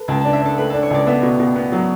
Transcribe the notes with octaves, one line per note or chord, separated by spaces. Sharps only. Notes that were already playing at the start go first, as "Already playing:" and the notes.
Already playing: A4 B4
C#2 A5
D4 A5
E5
D4 A4
A3 B4
D4 A4
C#5
C#2 D5
B3 E5
B2
B2
B3
F#3